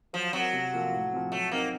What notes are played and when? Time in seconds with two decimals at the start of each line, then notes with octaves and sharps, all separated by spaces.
0.13 F3 F#3
0.33 F#3 C4 F#4 A#4
0.53 C3
0.73 F3 A#3 F4 A4
0.93 A2
1.13 F3 C4
1.32 F#3 A3
1.51 A#3 C4 D#4 A#4